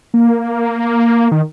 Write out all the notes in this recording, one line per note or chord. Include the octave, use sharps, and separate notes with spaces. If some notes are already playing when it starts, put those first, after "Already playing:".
A#3
D#3